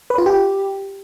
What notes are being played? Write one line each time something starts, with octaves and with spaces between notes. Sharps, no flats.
B4
F4
G4